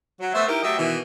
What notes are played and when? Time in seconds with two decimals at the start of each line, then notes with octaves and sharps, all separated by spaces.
0.20 F#3
0.34 A3 B3 C5 E5
0.48 D#4 E4 G4 A#4
0.63 F#3 A3 G4 D#5 E5
0.78 B2 D#3 E3